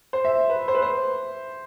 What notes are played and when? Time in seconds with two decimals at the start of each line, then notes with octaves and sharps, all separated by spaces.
0.13 C5
0.25 E5
0.50 B4
0.68 C5
0.75 B4
0.82 C5